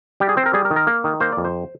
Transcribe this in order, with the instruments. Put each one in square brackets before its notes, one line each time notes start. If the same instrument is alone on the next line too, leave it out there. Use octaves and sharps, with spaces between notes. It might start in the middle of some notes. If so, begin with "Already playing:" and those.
[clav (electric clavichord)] G3 G4
G#4
C4 C5
A#4
G3 G#4
A#4
D#3
A#4
A#3
D#3
A#3 C5
D5
F2
C5